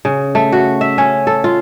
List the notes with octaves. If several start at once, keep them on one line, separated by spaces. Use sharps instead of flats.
C#3
A3
F#4
E5
C#4
A4
F4